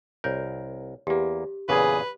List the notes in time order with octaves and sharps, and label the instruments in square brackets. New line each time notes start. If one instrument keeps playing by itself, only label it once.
[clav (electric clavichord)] C2 A#4 [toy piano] C#5
[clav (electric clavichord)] E2 A#3 [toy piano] G4
[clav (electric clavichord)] E2 A#2 C#3 [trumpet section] G#4 [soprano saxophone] B4